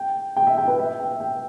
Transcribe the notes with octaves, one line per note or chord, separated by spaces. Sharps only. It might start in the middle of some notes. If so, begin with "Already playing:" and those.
Already playing: G5
G5
E5
G5
B4
E5
G5
G5